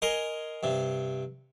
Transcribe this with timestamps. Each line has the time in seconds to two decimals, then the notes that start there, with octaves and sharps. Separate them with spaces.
0.02 A#4 D#5 G#5 C6
0.63 G2 C3